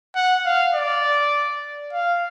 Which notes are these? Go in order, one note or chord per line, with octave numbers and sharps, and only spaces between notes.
F#5
F5
D5
F5